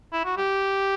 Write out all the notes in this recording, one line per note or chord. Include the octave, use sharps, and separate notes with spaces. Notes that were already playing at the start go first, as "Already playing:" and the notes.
E4
F#4
G4